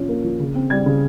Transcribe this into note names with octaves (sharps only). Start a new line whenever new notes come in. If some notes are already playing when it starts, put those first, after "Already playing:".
Already playing: A#2 F3 C#4
A#3
F3
C#3
C4
G3 G#6
C#3